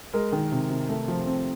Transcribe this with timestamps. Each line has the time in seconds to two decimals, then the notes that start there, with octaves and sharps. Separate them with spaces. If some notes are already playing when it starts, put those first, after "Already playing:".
0.13 G#3 A#4
0.32 D#3
0.52 C3
0.70 C3
0.89 A3
1.08 F3
1.26 C4